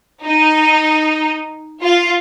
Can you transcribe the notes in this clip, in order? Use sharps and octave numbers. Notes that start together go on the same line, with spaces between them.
D#4
F4